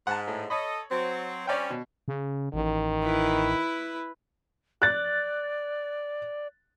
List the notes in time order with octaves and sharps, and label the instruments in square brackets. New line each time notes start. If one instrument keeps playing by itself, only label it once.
[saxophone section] G#2 [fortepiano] F#5 A5
[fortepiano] A2
[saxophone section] A4 D#5 [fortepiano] C#5 B5
[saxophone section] F#3 C4
[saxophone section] G3 C4 C#4 [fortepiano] C#5 D5 G5
[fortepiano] B2
[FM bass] C#3
[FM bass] A1 [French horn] D#3
[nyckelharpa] E4 B4
[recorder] D5 [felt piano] F#6 A6